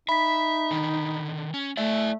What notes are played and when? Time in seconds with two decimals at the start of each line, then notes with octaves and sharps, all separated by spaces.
0.09 D#4 E5 B5 B6
0.71 D3 D#3
1.54 C#4
1.77 A3 E4 D5 E5